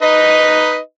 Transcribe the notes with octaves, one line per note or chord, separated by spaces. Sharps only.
D#4 B4 D#5